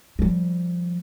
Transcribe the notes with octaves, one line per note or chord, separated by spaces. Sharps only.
F3 G3